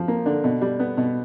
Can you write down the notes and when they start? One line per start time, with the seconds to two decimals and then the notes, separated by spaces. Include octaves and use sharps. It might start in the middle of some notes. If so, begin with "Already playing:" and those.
Already playing: F3
0.08 A#3
0.26 D3
0.44 B2
0.61 G3
0.80 B3
0.97 B2